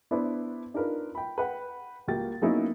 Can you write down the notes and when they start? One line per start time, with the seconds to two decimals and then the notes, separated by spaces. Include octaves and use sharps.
0.11 B3 D4 E4 B4 C5
0.74 D4 D#4 F4 A#4 B4
1.15 G5 B5
1.38 B4 F#5 G5 B5
2.08 C#2 G3 A#3 F#4 G5 A6
2.42 F#3 A#3 B3 C#4 D#4 E4